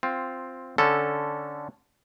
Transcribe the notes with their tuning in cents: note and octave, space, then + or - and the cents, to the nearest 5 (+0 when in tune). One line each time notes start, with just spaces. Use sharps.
C4 +0 F4 +10
D3 +0 C#4 +0 A4 +0